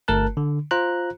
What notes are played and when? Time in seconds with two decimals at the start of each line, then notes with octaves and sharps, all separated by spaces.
0.08 G1 A3 A#4 A5 F#6
0.37 D3
0.71 F4 C5 A#5 F#6